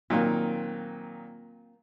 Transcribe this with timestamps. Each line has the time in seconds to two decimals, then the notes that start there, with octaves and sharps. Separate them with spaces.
0.10 A#2 D#3 F#3 A#3 C4 F4